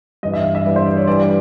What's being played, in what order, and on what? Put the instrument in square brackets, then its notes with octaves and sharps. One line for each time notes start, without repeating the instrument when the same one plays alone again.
[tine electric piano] G2 E3 G3 [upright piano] D#5
[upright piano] E5
F5
E5
[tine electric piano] G2 E3 G3 [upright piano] D5
[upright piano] C5
D5
C#5
[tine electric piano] G2 E3 G3 [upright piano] D5